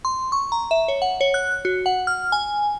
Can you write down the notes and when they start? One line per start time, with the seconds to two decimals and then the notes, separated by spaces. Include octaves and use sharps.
0.05 C6
0.32 C#6
0.52 A#5
0.71 E5
0.88 C#5
1.02 F#5
1.21 C#5
1.34 F#6
1.65 F#4
1.86 F#5
2.07 F6
2.32 G#5